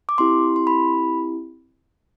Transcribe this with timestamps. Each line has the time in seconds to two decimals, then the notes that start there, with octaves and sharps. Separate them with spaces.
0.09 D6
0.18 C4 E4 G4 C6
0.56 C6
0.67 B5